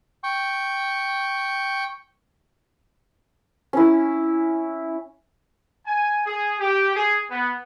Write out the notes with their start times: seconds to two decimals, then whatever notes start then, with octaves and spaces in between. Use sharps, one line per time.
0.24 G5 C#6
3.73 C#4 E4
5.87 G#5
6.26 G#4
6.60 G4
6.96 G#4
7.30 B3